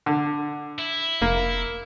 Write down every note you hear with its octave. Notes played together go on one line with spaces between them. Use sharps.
D3
E4
F1 A#3